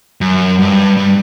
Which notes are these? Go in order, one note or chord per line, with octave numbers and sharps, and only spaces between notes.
F#2
G2
G2